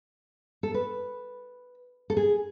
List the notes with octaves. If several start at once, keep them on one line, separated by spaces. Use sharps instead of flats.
A4
B4
A4
G#4